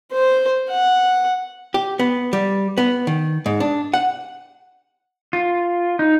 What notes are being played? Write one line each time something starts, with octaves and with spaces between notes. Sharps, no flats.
C5
F#5
G4
B3
G3
B3
D#3
G#2
D4
F#5
F4
D#4